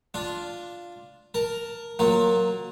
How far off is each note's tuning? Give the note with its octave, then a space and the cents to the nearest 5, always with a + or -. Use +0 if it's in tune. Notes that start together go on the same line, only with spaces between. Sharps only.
D4 +0 F4 +0
A#4 +5 A5 +20
F#3 +0 A#3 +0 F4 +25